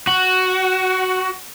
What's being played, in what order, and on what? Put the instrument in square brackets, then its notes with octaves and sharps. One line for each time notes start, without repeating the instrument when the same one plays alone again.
[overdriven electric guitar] F#4